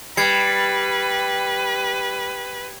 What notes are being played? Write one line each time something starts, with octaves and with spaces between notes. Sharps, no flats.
G3 B4 G#6 C7 C#7